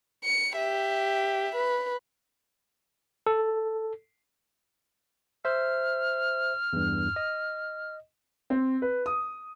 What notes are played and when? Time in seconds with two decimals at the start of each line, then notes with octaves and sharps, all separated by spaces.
0.24 C#7
0.55 G4 E5
1.55 B4
3.27 A4
5.45 C5 E5 F6
6.73 E2 G2
7.16 D#5
8.50 C4
8.82 B4
9.06 D#6